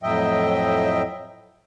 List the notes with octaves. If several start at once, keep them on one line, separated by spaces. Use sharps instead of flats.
F2 A2 F#3 D#5 E5 G5